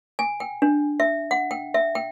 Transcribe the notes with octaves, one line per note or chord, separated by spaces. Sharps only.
G#5
G5
D4
E5
F#5
G5
E5
G5